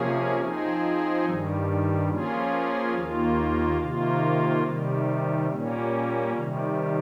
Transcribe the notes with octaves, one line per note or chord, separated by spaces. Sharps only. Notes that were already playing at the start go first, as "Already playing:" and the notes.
Already playing: C3 F3 A#3 C#4 G#4
F3 C4 D#4 G#4
G2 D#3 G3
F3 A#3 C#4 F4 G#4
D#2 D#3 A#3 F4
C3 D#3 A#3 F4
C3 D#3 G3
A#2 G3 A#3 C#4
C3 D#3 G3